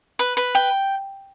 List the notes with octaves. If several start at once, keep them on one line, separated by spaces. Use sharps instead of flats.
B4
B4
G5